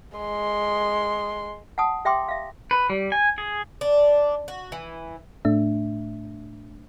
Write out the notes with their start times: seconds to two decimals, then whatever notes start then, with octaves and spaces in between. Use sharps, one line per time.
0.17 G#3 C6
1.78 F#5 A5 D#6
2.05 G4 E5 G5 C6 D6
2.26 E5 F5 C6
2.71 B4
2.90 G3
3.12 G#5
3.38 G#4
3.81 D4
4.48 F#4
4.72 E3
5.45 A2 A3 D4 E5